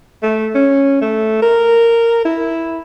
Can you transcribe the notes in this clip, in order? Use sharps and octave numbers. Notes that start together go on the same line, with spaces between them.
A3
C#4
A3
A#4
E4